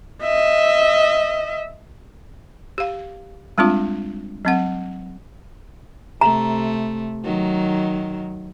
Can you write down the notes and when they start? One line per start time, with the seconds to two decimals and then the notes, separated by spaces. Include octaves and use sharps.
0.23 D#5 E5
2.78 G4 F5
3.58 G3 G#3 C4 D4 F4
4.45 F#3 C4 F#5
6.21 C3 A3 A#5
7.24 D#3 F#3